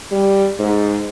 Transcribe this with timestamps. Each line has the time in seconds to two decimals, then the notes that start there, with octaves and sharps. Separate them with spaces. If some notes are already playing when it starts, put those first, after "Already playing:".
0.11 G3
0.60 G#2